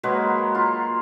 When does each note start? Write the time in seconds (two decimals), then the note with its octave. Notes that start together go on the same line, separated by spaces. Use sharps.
0.03 F#3 G#3 A#3 B4
0.55 F4